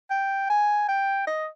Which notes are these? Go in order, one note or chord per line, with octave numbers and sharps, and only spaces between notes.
G5
G#5
G5
D#5